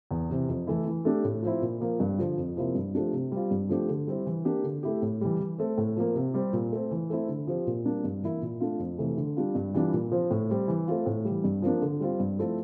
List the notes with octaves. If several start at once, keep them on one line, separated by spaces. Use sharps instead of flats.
E2
C3 E3
F2
E3 A3 E4
E3
A3 D4 G4
A2
F3 C4 E4
A#2
F3 A#3
G2
D3 F3
F2
C3 F3 A#3 E4
G2
F3 A3 D4 G4
C3
G3 C4 F4
G2
F3 A3 D4 G4
D3
G3 C4 E4
E3
A#3 D4 G4
D3
A3 E4 G4
A2
E3 G3
E3
A3 C4
A2
F3 A#3
C3
G3 C4 G4
A#2
A3 C4
E3
A3 C4 E4
D3
F3 C4 G4
A#2
G3 A#3 D4
G2
E3 A#3 E4
A#2
A3 D4 F4
F2
C3 E3 A3
D3
G3 D4 F4
G2
E3 G3 D4 F4
A#2
F3 C4
A2
G3 C4
E3
A3 C4 F4
A2
E3 G3
G2
F3 A#3 D4
D3
G3 C4 F4
G2
F3 A3 C4 E4